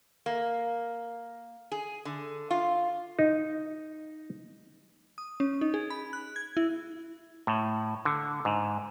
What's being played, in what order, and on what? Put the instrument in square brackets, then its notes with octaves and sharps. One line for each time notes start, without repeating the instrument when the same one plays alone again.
[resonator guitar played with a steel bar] A#3
G#4
D3
F4
[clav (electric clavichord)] D#4
[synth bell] D#6
C#4
D#4
G#4
B5
F#6
G#6
E4
[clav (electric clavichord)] A2
D3
G#2